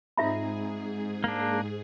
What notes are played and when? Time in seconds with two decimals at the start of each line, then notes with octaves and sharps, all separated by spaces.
0.17 G#2 C4 D#4 F4 G#4 E5 A#5 B5
1.24 A#3 D4